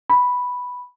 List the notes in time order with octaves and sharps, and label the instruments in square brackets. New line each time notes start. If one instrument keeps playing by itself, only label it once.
[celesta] B5